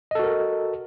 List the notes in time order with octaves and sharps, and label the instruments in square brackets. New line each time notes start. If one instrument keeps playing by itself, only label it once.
[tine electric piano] D#5
A4
F#4
A#4